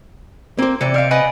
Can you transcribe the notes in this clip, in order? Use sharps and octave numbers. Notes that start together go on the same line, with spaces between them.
A#3 C4 C5
C3 E3 D5 C#7
C5 D5 D#5 F5 D7
B4 D#5 F#5 G#5 B5